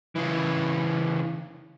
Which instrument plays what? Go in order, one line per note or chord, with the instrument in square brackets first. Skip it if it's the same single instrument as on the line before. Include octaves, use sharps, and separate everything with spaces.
[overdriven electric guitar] C#3 E3